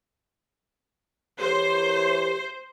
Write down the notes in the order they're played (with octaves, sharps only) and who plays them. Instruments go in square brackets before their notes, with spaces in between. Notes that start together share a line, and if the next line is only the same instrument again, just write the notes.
[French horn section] E3 A#4 C#5 [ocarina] G4 [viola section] C5